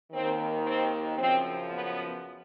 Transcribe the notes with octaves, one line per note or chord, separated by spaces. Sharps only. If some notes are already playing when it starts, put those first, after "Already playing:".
D#2 D#3 C4
C4
F#2 C#3 F3 C4
B3